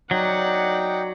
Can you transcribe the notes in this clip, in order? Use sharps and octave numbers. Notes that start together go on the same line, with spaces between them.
F#3 D#4 D5 F#5 G5